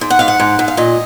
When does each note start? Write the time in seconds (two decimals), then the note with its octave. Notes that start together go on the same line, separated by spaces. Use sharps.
0.01 G#2
0.10 F#5
0.19 G#2 F5
0.28 F#5
0.40 G#2
0.59 G#2
0.68 F5
0.77 A#2 D#5